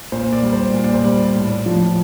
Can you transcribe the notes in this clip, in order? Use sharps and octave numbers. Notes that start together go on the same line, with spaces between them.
A#2 C5
D5
G3
C5
A#2
D5
C5
G3 D5
A2
F3